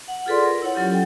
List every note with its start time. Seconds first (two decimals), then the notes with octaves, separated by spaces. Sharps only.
0.08 F#5
0.26 F4 G#4 A4 B4 D5 C6
0.43 A#4
0.62 E4 C#5 F#5
0.75 F#3 C#4 F4 G4
0.90 A4 G5